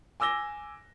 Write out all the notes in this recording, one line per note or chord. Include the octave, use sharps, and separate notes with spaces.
G#5 D6 E6 A#6 G7